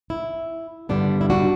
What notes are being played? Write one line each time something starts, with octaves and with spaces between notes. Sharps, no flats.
E4
G2 D3 G3 B3 D4
E4
D4 F#4